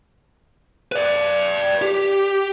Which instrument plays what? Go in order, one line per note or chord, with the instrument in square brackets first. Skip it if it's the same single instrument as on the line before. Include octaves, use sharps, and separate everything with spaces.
[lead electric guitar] B4 D5
G4